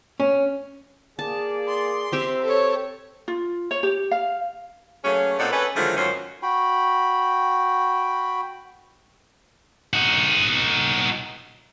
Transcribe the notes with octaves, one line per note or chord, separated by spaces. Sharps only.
C#4
A#3 G#4 D5 A5
C6
C4 G4 E5
A4 C#5
F4
C#5
G4
F5
F#3 A3 A#3 C#4 G#4
A#2 C4 D#4 A4 D5 F#5
C#4 G#4 A4 B4
D3 D#3 F3 F#3 G#3 A3
F#2 D#3 F#3 C#4 F4 C5
F#4 G5 B5
D#4 F#4